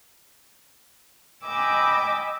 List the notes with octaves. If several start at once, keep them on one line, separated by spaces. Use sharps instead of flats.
D#5 G5 G#5 B5 D6 E6